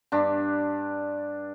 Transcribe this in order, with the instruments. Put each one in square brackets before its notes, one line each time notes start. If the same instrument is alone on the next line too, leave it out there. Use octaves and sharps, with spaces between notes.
[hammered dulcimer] G2 D4